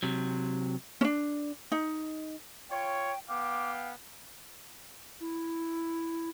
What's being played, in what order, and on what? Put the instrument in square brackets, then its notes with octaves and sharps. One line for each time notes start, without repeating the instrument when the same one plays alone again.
[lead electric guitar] C3 F#3
[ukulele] C#4 D4
D#4
[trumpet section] F4 C#5 [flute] G5
[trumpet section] B3 F5 G5 [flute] D6
[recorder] E4